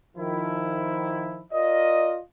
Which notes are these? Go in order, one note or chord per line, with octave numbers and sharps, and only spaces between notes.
D#3 F3 E4
F4 A#4 D5 D#5